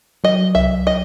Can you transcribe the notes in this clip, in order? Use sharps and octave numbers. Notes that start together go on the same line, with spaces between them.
F#3 D#5
C2 E5
D#5